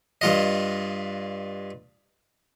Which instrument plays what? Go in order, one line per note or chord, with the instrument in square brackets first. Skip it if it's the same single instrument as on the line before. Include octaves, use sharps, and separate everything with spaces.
[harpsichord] G2 F4 D#5